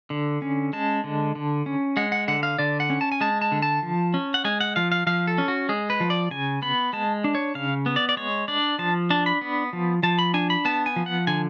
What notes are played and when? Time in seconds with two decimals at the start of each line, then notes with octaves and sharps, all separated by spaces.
0.10 D3
0.42 C#4
0.73 G#3 A5
1.04 D3
1.35 D3
1.66 C#4
1.97 G#3 F#5
2.12 F#5
2.28 D3 F#5
2.43 F5
2.58 D3 D5
2.80 F#5
2.90 C#4
3.01 A5
3.12 G#5
3.21 G#3 A5
3.42 A5
3.52 D3
3.62 A5
3.83 F3
4.14 C#4
4.34 F#5
4.45 G#3 G#5
4.61 F#5
4.76 F3 F5
4.92 F5
5.07 F3 F5
5.27 A4
5.38 C#4
5.48 F#4
5.69 G#3 G#4
5.90 B4
6.00 F3
6.10 D5
6.31 C#3 G#5
6.62 B3 B5
6.93 G#3 A5
7.24 D4
7.35 C#5
7.55 C#3 F5
7.86 B3
7.96 D5
8.09 D5
8.17 G#3 C#5
8.48 D4 D5
8.79 F3 A5
9.10 D4 A5
9.26 B5
9.41 B3
9.73 F3
10.03 F3 A5
10.19 B5
10.34 D4 G#5
10.50 B5
10.65 B3 A5
10.86 G#5
10.96 F3
11.06 F#5
11.27 D3 G#5